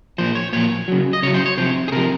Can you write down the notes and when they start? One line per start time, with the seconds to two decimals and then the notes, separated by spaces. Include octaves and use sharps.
0.18 A#2 F3 C5
0.35 C#5
0.53 A#2 F3 C#5
0.88 C#3 F#3
1.13 D#5
1.22 C#3 C#5
1.27 F#3
1.34 C5
1.46 C#5
1.57 C3 F3 C5
1.88 G#4
1.92 C3 F3 A#4